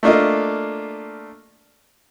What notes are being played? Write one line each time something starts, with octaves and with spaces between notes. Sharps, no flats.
A3 A#3 D4 F4 D#5